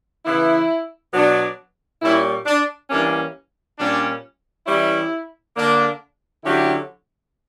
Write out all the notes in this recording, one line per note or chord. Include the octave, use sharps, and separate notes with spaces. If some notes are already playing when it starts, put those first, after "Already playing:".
C#3 E3 B3 E4
B2 F#3 B3 D4
A#2 G3 C#4 E4
D4
E3 G3 A#3 C#4 D4
A#2 G3 C#4 D4
E3 G3 C#4 E4
D3 A#3 D4
D3 F#3 C#4 E4 G4